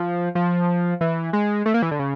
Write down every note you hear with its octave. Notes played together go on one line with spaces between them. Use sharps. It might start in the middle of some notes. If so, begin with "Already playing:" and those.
Already playing: F3
F3
E3
G#3
A3
A#3
E3
D3
C#3